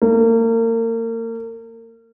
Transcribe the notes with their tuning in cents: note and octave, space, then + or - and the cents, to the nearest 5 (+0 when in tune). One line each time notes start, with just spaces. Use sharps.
A#3 -35